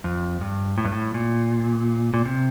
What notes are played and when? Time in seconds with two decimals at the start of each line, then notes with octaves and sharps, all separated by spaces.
0.04 F2
0.41 G2
0.78 A2
0.85 G2
0.92 A2
1.14 A#2
2.14 A#2
2.25 C3